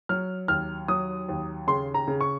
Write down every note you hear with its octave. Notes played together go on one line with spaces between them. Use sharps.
F#3 F6
D#2 F6
F#3 D#6
D#2
C#3 C6
A#5
C#3
C#6